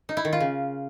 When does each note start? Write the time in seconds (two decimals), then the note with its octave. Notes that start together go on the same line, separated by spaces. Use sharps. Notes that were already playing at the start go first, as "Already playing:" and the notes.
0.09 D#4
0.17 E4
0.25 D#3
0.33 F4
0.40 C#3